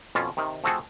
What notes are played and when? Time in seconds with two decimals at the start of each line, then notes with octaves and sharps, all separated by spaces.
0.15 F2 B2 C#4 F4 A5
0.37 C3 D#3
0.64 F3 A3 C4 F#4 G#4 A4